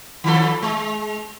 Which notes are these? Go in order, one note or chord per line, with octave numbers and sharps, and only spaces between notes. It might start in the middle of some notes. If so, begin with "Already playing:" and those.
D#3 F3 A4
G#3